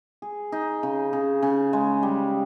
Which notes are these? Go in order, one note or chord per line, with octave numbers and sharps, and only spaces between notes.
G#4
D#4
C#3
C#3
C#3
G#3
G3